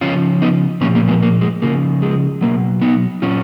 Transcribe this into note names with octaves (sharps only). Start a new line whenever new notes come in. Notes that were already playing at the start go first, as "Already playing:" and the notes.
C#3 F3 C#4 F4
B3 D#4
A#2 F3 A#3 C#4
A#3
G#3 B3
A#3
G#3
C#3 F3 A#3
G#3
B2 F#3 A#3
B3 D#4
A#2 F#3 C#4 F4